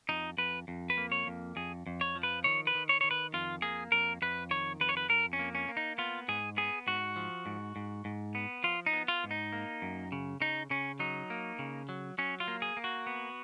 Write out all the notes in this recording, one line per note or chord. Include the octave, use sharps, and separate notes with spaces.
F2 D#4
F2 B4
F2
B4
A#3
C#5
F2
F2 G#4
F2
C#5
F3
B4
D#3 C#5
B4
D#3
C#5
D#3 C#5
B4
F2 F4
A#3 G#4
F2 A#4
F2 B4
D#3 C#5
F2 B4
C#5
B4
F2 A#4
C#4
A#3
C#4
A#3
D#4
B3 F4
G#2 G#4
B3 G#4
G#2 F#4
F3
G#2
G#2
G#2
B3
F3 F4
D#4
B3
F4
G#2
D#4
A#3
F#2
C#3
C#3 D#4
C#3 C#4
F#3 D#4
A#3
C#3
F#3
F#3 C#4
F4
A#3
G#4
A#3
F#4
B3